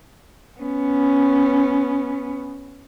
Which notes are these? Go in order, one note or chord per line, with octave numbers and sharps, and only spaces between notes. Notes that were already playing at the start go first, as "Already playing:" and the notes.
B3 C#4